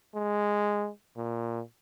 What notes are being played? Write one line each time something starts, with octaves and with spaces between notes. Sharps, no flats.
G#3
A#2